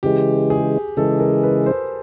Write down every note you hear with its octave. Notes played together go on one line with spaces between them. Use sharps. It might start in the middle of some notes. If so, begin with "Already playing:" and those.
C#3 E3 G#3 G4
G#4
C#3 E3 G#3 A4
A#4
B4
C5